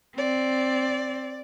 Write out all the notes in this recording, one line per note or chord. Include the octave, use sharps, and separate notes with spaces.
C4 D5